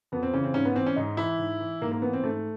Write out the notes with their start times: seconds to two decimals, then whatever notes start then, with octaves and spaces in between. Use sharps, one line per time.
0.12 F2 B3
0.23 C4
0.33 C#3 E3 C#4
0.44 C4
0.54 G#2 C#4
0.65 B3
0.75 E3 C4
0.86 C#4
0.96 G#2 D#4
1.17 E3 E4
1.38 G#2
1.60 E3
1.81 G#2 A#3
1.92 A#3
2.02 E3 B3
2.13 C4
2.23 G#2 A3